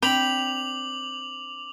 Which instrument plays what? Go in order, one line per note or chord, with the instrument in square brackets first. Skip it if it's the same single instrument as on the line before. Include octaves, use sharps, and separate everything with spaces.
[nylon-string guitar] C4 D4 [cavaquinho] G5 B5 [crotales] D6 F7 F#7